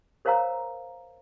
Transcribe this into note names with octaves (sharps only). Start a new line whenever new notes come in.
A#4 C5 C#5 F5 A#5 E6